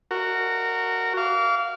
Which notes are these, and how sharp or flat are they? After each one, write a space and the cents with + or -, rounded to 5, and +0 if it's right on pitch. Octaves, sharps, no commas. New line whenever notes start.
F#4 +0 A#4 -20
F5 -10 D6 -40